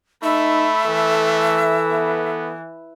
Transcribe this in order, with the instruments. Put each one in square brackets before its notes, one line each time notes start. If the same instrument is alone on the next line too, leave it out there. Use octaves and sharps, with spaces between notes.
[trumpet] A3 [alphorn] D#4 [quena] E5 [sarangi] B5
[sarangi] E3 [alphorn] A4
[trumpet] B3